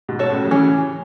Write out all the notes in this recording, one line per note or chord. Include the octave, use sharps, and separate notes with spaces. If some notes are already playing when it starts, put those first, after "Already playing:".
G#2 B2
F#4 A4 C#5
A2 C#3
F#3
C#3 E3 C#4